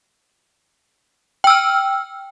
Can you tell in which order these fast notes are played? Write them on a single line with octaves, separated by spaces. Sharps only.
G5 E6 F6